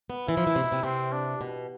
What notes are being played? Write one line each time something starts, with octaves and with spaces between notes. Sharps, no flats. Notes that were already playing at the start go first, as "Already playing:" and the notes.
B3
E3 E4
F3
E3
C3
B2
C3
C3 C4
D4
B2